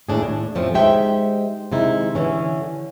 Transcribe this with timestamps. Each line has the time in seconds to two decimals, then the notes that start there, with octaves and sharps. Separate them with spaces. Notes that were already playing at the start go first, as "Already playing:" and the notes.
0.09 D#2 A2 D4 G#4
0.23 A2
0.55 F2 A2 F3 A3 C4 C#4
0.74 G#3 D#4 G4 C5 E5 G5
1.72 C3 D#3 G#3 D#4 E4
2.15 D3 E3 C#4